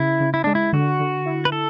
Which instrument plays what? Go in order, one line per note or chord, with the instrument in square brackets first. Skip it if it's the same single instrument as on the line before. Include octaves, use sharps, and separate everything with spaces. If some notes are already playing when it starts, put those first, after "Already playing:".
Already playing: [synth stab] C#3 [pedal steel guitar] E4
[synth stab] C#3
[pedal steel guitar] E4
[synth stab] G#3 [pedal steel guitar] D4
[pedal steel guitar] E4
[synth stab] D3 [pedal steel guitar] F#4
[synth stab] D3
E4
[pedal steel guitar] B4
A4